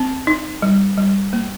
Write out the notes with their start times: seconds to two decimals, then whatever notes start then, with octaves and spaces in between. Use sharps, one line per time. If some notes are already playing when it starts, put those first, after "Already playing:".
Already playing: C4
0.27 D#4
0.62 G3
0.97 G3
1.33 A#3